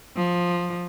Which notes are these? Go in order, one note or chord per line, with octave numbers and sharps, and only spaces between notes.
F3